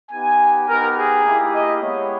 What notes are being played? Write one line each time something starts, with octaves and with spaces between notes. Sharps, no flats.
B3 D#4 G4 G#5
B3 D#4 G4 A#4
G#4
A#3 E4 G4
D#5
G#3 B3 E4 G4 C#5